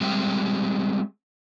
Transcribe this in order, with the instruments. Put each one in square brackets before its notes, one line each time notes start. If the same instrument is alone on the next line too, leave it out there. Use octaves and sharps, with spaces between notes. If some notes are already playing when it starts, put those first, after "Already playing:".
[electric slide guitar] G3 G#3 C4 G4 E5